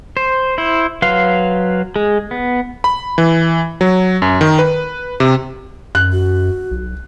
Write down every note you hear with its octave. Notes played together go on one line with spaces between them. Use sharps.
C5
E4 C5
F#3 B4 F5 C6
G#3 G#4
B3
B5
E3
F#3
F#2
D#3
B4
C3
F#2 F#6
F#4
B1